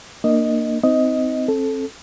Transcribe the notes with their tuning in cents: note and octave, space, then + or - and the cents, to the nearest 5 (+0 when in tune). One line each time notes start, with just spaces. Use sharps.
A#3 +0 D4 +25 D#5 +0
C4 -25 D#4 +15 D#5 +10
C4 +35 A4 -10